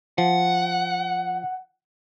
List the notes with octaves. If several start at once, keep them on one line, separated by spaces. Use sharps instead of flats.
F3 F#5